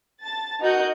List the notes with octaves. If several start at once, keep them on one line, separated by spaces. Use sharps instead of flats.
A5 A6
D#4 F#4 A#4 D#5 F#5 G6